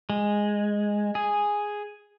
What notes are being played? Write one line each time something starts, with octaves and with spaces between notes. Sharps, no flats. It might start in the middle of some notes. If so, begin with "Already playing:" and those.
G#3
G#4